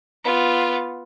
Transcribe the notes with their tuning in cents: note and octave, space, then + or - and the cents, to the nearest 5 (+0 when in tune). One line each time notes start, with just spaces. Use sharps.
B3 +0 F4 +0